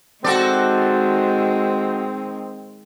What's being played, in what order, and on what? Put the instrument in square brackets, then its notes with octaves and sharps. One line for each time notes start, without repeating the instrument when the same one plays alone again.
[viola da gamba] D#3 G#3 [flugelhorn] C4 [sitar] F#4 A4 D5